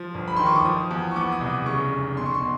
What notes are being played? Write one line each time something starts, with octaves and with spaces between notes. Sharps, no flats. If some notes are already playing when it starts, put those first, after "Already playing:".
Already playing: F3
G1
B5
D#3 C6
C#6
D6
F3 D#6
E2
C#6
B3 D6
D#6
C2
D6
C#3 C#6
F1
B2 C6
C#6
C6
B2